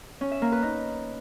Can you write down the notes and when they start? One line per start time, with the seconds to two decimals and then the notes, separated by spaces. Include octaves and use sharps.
0.21 C#4
0.31 E5
0.42 A#3
0.52 B4
0.63 D#4